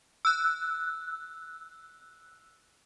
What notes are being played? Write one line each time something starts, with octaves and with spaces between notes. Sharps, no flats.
E6 F#6